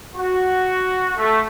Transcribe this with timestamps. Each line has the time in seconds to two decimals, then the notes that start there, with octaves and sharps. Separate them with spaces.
0.15 F#4
1.16 A3